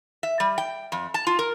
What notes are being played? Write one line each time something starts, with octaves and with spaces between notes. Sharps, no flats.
E5
G3
G5
F2
A5
F4
A#4